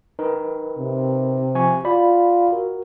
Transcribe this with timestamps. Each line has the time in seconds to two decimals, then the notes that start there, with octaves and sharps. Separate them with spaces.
0.19 D#4 A#4 B4
0.78 C3
1.55 F3 G#5 C#6
1.85 F4 D5 B5
2.51 F#4 A#4